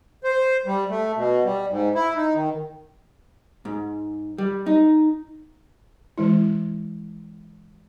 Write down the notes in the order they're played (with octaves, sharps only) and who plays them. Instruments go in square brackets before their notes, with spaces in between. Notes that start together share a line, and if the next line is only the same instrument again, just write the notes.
[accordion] C5
G3
A3
B2
G3
G#2
E4
D#4
D#3
[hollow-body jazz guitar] G#2
G3
D#4
[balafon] E3 G#3 E4